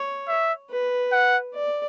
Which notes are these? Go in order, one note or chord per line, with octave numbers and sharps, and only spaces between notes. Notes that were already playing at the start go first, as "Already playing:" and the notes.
Already playing: C#5
E5
B4
F#5
D5